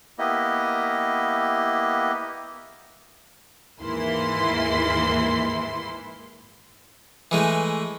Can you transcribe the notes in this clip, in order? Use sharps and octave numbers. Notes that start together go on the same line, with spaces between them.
A#3 B3 E4 G4 D#5
D#2 G#2 E3 A#3 E4 C6
E3 G#3 A3